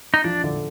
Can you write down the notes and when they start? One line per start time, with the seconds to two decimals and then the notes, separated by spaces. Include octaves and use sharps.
0.14 D#4
0.24 F3 D4
0.44 D3